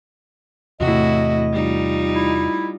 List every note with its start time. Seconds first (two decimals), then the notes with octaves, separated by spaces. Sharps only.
0.80 E2 A2 C3 E4 F#4 D#5
1.53 G3 D#4 F4
2.14 E4